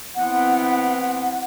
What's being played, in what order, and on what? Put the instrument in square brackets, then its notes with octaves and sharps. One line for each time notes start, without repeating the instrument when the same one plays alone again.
[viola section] E3 B3 C4 [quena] F#5